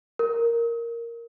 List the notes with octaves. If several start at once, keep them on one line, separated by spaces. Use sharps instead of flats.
A#4